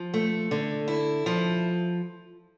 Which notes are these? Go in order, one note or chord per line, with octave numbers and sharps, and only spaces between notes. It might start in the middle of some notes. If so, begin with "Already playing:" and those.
Already playing: F3
A3
D3
E4
F3